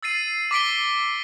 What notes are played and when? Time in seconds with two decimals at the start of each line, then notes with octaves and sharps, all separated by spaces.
0.03 E6 A6 C7 D#7
0.51 D6 B6 D7 G7